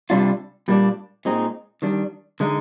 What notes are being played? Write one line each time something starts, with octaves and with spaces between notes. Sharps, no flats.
C3 G3 D4 F4
A#2 G3 A#3 D4
A#2 G#3 C4 D#4
D#3 G3 D4
D3 G#3 D#4